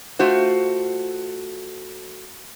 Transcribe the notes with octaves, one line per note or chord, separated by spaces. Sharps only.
A3 F4 F#4 C5